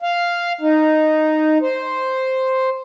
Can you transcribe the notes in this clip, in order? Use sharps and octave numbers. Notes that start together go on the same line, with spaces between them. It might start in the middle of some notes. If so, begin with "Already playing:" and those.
F5
D#4
C5